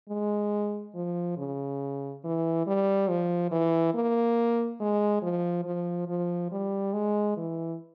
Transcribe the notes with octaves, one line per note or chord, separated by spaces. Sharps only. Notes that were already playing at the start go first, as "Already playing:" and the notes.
G#3
F3
C#3
E3
G3
F3
E3
A#3
G#3
F3
F3
F3
G3
G#3
E3